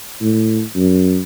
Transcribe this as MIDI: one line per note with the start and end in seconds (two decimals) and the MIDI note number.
0.22 0.62 45
0.76 1.22 42